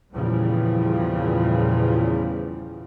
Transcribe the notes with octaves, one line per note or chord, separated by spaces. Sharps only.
E2 A#2 C#3 E3 F3 G3